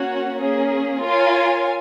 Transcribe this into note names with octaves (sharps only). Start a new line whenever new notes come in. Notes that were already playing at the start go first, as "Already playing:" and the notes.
Already playing: A#3 C#4 F#4 C#5
A#3 C#4 G#4
F4 A#4 C#5 F5 G#5